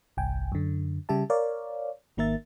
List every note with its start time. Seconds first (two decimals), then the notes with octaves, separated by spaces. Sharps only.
0.17 G1 C2 G5 G#5
0.52 F#2 D3
1.09 C#3 G3 G4 E5 A5
1.30 A#4 C#5 D5 F5
2.17 G#1 D#3 A#3 A#4 E5 A6